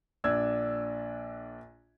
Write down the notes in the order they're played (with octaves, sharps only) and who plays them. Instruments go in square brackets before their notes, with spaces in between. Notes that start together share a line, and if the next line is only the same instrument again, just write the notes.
[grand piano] A#1 D4 E6 G#6